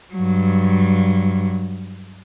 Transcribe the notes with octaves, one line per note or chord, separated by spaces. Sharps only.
G2 F#3